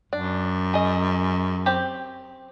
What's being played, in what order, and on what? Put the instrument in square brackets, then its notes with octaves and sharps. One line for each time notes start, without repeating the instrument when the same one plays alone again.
[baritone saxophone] F#2 [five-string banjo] D4
[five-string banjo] G#4 D#5
C4 G4